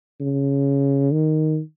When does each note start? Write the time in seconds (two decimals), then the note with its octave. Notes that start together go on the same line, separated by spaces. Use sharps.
0.21 C#3
1.12 D#3